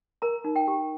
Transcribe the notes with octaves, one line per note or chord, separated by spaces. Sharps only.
A#4 A#5
D#4
G5
G4